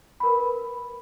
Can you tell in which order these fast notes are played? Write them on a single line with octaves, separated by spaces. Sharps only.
B5 A#4 B4